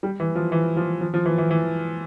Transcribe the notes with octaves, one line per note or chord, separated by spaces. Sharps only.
G3
E3
F3
E3
F3
F3
F3
E3
E3
E3